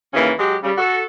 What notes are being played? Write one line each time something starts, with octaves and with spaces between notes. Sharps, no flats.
D#2 C#3 E3 A#3 C#4
F#3 G#3 G4
C#3 G3
F#4 A4